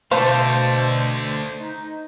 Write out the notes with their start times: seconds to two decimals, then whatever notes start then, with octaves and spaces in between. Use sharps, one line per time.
0.11 B2 D3 A3 C5 F5 A5
1.61 D#4